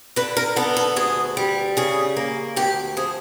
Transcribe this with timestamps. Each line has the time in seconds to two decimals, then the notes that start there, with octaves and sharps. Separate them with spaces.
0.16 D3 B4
0.37 A#4
0.56 B3 A4
0.77 A4
0.96 D2 G#4
1.37 G3
1.77 C#3 G#4
2.17 A#3
2.56 D2 G4
2.97 F3 G#4